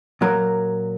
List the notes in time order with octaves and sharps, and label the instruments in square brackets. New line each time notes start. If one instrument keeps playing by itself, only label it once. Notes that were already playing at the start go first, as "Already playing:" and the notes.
[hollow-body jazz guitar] A#2 F#3 A#4